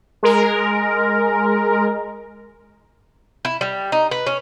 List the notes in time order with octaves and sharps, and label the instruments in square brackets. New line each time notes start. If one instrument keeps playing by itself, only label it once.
[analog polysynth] G#3 A#4
[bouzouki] E4
G3
D#4
B4
C#4